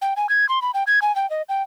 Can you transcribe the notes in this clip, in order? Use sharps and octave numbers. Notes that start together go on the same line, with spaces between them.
G5
G#5
G#6
C6
B5
G5
G#6
G#5
G5
D#5
G5